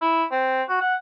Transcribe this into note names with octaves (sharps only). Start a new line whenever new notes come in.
E4
C4
F#4
F#5